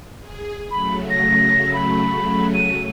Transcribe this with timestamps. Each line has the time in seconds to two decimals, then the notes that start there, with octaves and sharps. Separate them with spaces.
0.20 G#4
0.71 C#3 F#3 A3 B5
1.10 A#6
1.73 B5
2.54 D#7